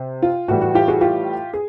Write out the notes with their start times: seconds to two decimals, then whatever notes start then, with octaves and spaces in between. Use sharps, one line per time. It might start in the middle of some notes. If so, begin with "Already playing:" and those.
Already playing: C3
0.22 F4
0.48 A2 E3 G3 F#4
0.61 F#4
0.75 F4 G4
0.88 F#4 G#4
1.01 F4 G4
1.54 G#4